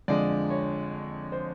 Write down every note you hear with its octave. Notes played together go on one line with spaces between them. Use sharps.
F2 D3 F3 G#3 D5
C#5
C5